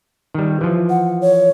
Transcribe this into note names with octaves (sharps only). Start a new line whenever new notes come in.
D#3 G3
E3 F3
F#5
C#5